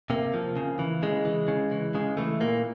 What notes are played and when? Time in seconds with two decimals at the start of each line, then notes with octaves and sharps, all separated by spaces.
0.10 C3 A#3
0.34 F3
0.57 C#3
0.79 E3
1.02 C#3 G#3
1.25 E3
1.48 C#3
1.72 E3
1.95 C#3 G#3
2.17 E3 A3
2.40 A#2 A#3